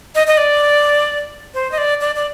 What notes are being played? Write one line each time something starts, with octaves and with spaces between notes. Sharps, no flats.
D#5
D#5
D5
C5
D#5
D5
D5
D5